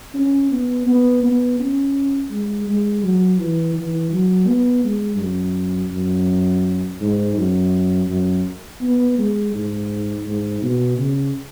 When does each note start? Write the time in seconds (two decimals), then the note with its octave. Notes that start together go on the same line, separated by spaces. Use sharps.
0.14 C#4
0.51 B3
0.86 B3
1.23 B3
1.59 C#4
2.31 G#3
2.68 G#3
3.03 F#3
3.39 E3
3.76 E3
4.12 F#3
4.47 B3
4.84 G#3
5.20 F#2
5.92 F#2
7.01 G#2
7.37 F#2
8.09 F#2
8.81 B3
9.18 G#3
9.54 G#2
10.25 G#2
10.62 B2
10.98 C#3